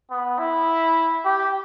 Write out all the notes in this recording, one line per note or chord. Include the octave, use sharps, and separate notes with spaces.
B3
E4
G4